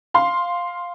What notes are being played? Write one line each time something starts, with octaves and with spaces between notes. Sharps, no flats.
F5 C6